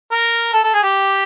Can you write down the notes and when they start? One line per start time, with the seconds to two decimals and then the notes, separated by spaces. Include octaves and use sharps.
0.12 A#4
0.53 A4
0.64 A4
0.74 G#4
0.83 G4